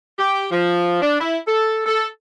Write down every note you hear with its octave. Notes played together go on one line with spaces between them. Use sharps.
G4
F3
D4
E4
A4
A4